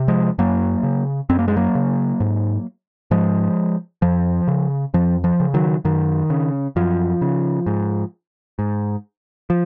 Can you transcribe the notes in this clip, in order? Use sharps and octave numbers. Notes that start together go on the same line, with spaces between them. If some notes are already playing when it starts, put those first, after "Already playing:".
Already playing: C3
F3 G#3
F#2 F#3 A#3
C#3
F#2 C4
A#3
G#3
F#3 A#3
C#3
G#2
G#2 F3 G#3
F2 F3
C#3
F2 F3
F3
C#3
D#3 F#3
F#2 D#3
C#3
F#2 F3
C#3
G#2
G#2
F3